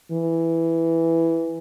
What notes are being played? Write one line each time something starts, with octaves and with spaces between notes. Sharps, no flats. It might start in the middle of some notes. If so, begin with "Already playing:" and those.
E3